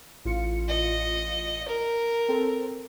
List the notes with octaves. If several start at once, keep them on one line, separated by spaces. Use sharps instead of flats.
A1 F4 C#7
D#5
A#4
C4 A4